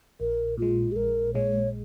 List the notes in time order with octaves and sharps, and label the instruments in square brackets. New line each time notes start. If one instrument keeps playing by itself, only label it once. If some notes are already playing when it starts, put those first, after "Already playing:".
[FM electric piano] A#1 [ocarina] A#4
[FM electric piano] A#2 G#3 [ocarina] F4
[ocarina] G#4
[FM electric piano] A#1 [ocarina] A#4
[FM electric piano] A#2 G#3 [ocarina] C#5